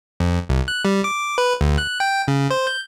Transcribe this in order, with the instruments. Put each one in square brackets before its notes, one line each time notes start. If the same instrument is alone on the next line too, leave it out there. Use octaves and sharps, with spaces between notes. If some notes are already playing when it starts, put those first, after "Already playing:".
[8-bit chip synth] F2
C2
F#6
G3
D6
B4
D2
F#6
G5
C#3
C5
G6